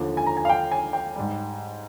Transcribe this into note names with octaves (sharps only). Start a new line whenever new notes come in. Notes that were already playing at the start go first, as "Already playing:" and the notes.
Already playing: D#2 D3 F3
G#5
A#5
G#5
F5
G5
G#5
G5
G#2 G3